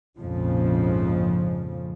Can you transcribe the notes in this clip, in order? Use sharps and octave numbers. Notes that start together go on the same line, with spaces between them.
A#1 F2 G#2 C#3 F3